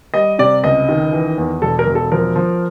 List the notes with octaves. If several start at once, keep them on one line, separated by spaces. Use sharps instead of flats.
G3 D#5
C3 D5
C#2 D#5
D#3
E3
E2
E1 A4
A#4
E1
A4
F3 A#4
F3